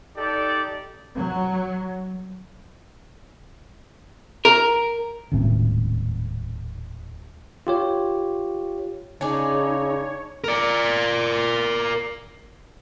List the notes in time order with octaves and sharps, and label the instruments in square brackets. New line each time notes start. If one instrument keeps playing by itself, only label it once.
[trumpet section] D#4 G4 A4 D5
[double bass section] F#3
[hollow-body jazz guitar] A#4
[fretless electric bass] D#1 C#2 A2 C4
[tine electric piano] F4 G4 C#5
[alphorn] C#3 [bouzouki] D4 G#4 D5 [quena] D#4 [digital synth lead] C#5
[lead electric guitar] A#4 D5